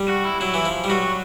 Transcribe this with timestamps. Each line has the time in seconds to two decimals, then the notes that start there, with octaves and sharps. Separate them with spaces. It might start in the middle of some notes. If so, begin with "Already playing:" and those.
Already playing: G3
0.08 F#4
0.24 E4
0.40 F#3 E4
0.54 E3
0.65 F3
0.84 G3
0.90 F#3 F#4